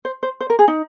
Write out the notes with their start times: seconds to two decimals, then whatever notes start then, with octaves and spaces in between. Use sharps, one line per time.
0.05 C5
0.23 C5
0.41 C5
0.50 A#4
0.59 G#4
0.68 D#4